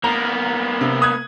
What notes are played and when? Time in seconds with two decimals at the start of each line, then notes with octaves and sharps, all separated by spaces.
0.04 A#3 B3 A#5
0.81 C3
1.02 D#6 F#6 G#6